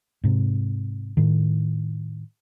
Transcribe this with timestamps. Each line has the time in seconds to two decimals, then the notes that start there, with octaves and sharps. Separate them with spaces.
0.24 G#2 C3
1.17 A2 D#3